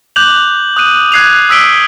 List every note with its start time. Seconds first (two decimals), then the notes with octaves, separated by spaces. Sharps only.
0.16 D6 F#6 G6 F7 F#7
0.76 D#6 F#6 D#7
1.12 F#6 G#6 C7 D#7 F7
1.49 D#6 E6 B6 D7 G7